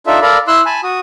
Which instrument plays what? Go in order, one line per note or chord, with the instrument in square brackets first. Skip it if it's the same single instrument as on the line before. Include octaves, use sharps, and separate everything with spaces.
[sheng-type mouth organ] D4 D#4 F4 A4 E5
A4 A#4 D5 F5 A#5 B5
E4 C6 E6 F#6
G#5 A5 B5
F#4 D#6